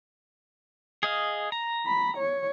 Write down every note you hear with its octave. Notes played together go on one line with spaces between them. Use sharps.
G#4 D#5 F5
A#5
B5
C#5